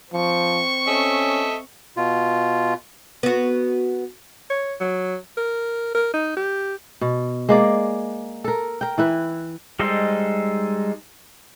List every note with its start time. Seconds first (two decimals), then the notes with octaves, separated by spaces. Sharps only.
0.13 F3 C4 C#6
0.87 C#4 A4 D#5 E5
1.97 B2 F4
3.23 B3 F#4
4.50 C#5
4.80 F#3
5.37 A#4
5.95 A#4
6.14 D#4
6.37 G4
7.01 B2
7.49 G#3 A#3 D5
8.44 A4 A#4
8.81 A#4 G5
8.98 E3 E4 B4
9.79 G3 G#3 D#4 A4 C5